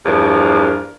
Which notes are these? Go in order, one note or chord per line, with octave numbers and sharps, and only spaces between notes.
E2 G2 F3 A#4